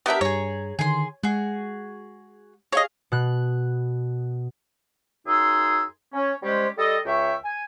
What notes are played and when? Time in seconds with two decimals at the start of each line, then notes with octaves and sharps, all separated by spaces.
0.06 B3 D4 G4 A#4 E5
0.21 G2 G#4 C#5 A#5
0.79 D3 D#3 G#4 C6
1.23 G#3 F#4 G#4
2.72 G#4 C#5 D#5 F5
3.12 B2 F#6
5.27 F#2 D#4 G#4 C6 E6
6.13 C#4
6.42 G3 G#3 C#4 G4 C5
6.78 G3 A4 D#5
7.06 C#2 C#5 E5 G5 C#6
7.44 G#5